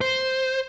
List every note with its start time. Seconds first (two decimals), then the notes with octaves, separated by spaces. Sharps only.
0.01 C5